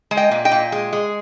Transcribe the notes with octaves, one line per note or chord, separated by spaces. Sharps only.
G#3
D#5 G5
A#2
D#5 G5
A#2
G#3
G#3